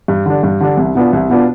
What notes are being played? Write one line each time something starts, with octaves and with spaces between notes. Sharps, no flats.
G2
D3 G3 D4
G2
D3 G3 D4
C2
B2 B3 D4 F4
C2
B2 B3 D4 F4